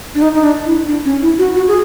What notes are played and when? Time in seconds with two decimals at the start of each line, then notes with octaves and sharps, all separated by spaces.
0.15 D4
0.22 D#4
0.34 D#4
0.44 D4
0.66 E4
0.88 D4
1.05 C#4
1.22 E4
1.38 F#4
1.55 F#4
1.68 G#4